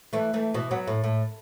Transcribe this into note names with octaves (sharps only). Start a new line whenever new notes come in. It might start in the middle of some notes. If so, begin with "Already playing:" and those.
E3 A3
E3 A3
B2 E3
F#3 B3
A2
A2